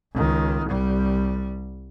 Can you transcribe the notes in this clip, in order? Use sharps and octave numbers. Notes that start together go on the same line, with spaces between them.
C#2 D#3
C2 G3